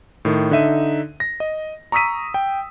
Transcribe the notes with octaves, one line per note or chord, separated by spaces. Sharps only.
A2 D#3
D3 D#4 E5 D#7
A#6
D#5
A#5 C#6 D#6 E6 B6 D#7
G5